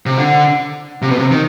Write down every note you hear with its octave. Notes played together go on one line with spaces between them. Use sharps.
C3
D3
C3
B2
C3
D#3